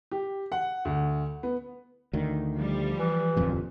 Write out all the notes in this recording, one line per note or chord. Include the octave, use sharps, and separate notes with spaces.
G4
F#5
D2
B3
D2 D#3
F3 G3
E3
D1 F2 A#2